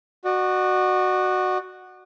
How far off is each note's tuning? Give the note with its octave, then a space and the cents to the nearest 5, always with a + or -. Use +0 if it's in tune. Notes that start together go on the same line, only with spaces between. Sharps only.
F#4 +0 D5 +45